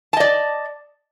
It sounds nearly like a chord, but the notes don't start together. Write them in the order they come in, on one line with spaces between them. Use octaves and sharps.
A5 D#5 D5